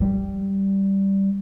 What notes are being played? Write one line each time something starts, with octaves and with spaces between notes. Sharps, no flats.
G3